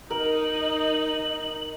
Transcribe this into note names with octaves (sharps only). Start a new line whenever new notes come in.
D#4 A#4 F#7